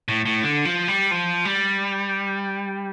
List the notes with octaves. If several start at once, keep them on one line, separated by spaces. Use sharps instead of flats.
A2
A2
D3
F3
G3
F3
G3